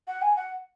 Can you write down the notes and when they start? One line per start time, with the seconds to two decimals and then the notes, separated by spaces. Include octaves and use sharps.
0.08 F#5
0.22 G#5
0.36 F#5